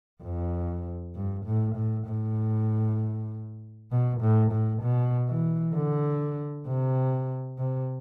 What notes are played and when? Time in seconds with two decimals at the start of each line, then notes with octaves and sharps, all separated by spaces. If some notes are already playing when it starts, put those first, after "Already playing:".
0.23 F2
1.15 G2
1.46 A2
1.76 A2
2.07 A2
3.91 B2
4.21 A2
4.51 A2
4.82 B2
5.28 E3
5.74 D3
6.66 C3
7.58 C3